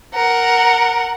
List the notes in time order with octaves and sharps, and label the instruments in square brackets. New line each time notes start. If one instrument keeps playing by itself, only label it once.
[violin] A#4 F#5